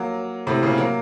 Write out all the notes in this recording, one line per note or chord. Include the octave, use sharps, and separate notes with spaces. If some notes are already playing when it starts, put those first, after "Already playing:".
Already playing: F#3 A#3
A2 C3
A#2 C#3
F#3 A#3